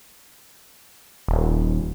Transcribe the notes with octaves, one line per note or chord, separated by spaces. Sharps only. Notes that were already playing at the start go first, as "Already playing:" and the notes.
D#1